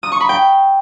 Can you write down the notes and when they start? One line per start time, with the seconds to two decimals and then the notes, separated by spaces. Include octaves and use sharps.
0.03 D#6
0.12 C#6
0.20 B5
0.29 G5